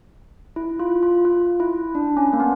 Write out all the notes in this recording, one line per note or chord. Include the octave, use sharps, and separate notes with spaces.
E4
F4
F4
F4
E4
D4
C#4
A#3
B3